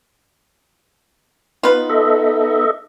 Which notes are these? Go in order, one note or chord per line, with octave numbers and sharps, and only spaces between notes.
B3 D#4 F4 B4
A4 D#5 E5